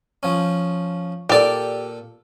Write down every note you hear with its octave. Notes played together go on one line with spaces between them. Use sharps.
F3 C#4
A#2 G4 A4 D5